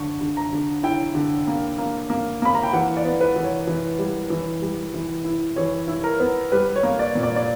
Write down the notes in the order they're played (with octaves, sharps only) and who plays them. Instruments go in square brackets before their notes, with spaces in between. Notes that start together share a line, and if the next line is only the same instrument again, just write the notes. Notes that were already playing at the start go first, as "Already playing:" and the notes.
Already playing: [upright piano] D3 C#6
D3
A#5
D3
E4 G5
D3
A#3
A#3
A#3
A#3 B5
A#5
G5
E3 F#5
D5
B3
B4
E3
C#5
E3
G3
E3
G3
E3
E4
E3 C#5
E4
A#4
B3
G3 B4
C#5
A#3
D5
A#2
D5
D5